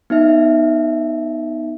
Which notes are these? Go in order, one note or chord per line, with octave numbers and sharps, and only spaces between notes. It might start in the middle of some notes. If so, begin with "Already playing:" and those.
B3 D#4 E5